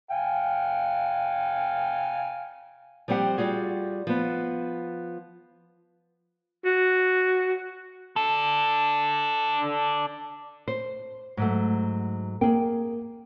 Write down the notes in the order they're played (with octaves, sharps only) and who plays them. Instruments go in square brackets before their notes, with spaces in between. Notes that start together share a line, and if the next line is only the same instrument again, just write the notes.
[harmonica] F5 G5 G#5
[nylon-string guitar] F3 G3 C4 G4 F#5
G3 F4 F#4 G#4
F3 B3
[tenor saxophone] F#4
[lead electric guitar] D4 A4
[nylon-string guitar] C5
G#2 F#3 A3
[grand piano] A#3 [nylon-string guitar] G#4 G5